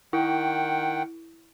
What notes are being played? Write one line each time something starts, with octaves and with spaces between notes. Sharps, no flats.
D#3 E4 F#5 G5